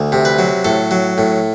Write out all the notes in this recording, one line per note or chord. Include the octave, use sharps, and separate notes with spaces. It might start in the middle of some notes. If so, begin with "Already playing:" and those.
Already playing: D2
C3
B4
F#3
A2 A4
F#3
A2